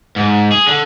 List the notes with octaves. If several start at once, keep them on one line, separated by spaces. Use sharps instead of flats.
G#2
G#4
D3